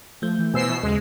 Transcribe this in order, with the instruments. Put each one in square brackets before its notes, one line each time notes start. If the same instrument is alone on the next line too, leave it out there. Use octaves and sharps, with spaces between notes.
[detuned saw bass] F3 [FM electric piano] A3 G6
[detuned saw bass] E3
[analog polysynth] B2 E6 C7 [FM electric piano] C5 G#5
[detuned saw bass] E4
[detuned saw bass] D#2 [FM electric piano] C#3 D#5 [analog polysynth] G#3